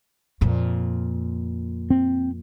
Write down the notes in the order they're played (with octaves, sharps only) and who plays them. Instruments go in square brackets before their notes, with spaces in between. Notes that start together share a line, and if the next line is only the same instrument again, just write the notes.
[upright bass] F2 A#2
[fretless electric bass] C4